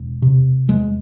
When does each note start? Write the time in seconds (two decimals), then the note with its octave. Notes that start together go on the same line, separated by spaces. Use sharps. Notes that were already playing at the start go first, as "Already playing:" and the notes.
Already playing: E1
0.22 C3
0.68 E2 G#3